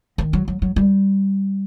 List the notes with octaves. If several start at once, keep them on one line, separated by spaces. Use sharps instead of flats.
D#3
F#3
F#3
F#3
G3